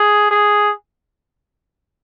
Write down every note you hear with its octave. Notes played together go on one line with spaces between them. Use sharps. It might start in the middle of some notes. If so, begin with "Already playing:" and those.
Already playing: G#4
G#4